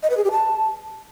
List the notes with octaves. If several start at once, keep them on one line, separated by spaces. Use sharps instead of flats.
D#5
B4
G#4
G4
A5